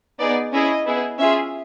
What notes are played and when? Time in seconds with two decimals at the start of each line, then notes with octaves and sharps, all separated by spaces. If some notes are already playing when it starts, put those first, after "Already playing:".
0.19 B3 D#4 G#4 D5
0.52 C#4 E4 G#4 D#5
0.85 B3 E4 G#4
1.18 C#4 F4 G#4 E5